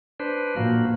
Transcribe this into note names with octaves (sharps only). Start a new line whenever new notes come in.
D4 B4 C5
A#2 F3 A#3 F#4